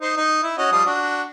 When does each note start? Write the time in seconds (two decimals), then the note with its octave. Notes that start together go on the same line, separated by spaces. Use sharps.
0.01 D#4 C5
0.17 D#4
0.43 E4
0.58 C#4 F#4 D#5
0.72 F3 G3 D#6
0.85 D4 F#4